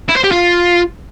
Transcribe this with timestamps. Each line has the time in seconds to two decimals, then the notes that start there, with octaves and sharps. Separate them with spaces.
0.09 E4
0.16 C5
0.24 G4
0.31 F4